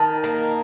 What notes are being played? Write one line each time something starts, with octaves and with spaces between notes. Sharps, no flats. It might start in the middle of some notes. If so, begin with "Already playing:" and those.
Already playing: D#3 A5
A#3